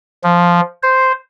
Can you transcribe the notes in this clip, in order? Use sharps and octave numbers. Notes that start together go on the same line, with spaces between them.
F3
C5